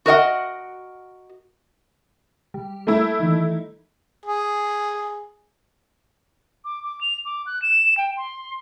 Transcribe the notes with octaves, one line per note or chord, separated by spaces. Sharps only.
F#4 A#4 D#5 F#5
G3
A3 A#3 E4
D#3 E3
G#4
D6
D6
F7
D6
F#6
E7
G5
C6